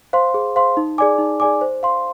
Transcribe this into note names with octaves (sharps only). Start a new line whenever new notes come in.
C5 F5 C6
G#4
C5 F5 C6
D#4
G#4 D5 G#5 D6
D#4
G#4 D5 G#5 D6
C5
F5 C6